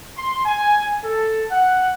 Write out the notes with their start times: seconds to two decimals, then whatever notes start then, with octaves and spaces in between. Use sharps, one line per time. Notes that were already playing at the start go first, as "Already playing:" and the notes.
0.17 C6
0.46 G#5
1.05 A4
1.51 F#5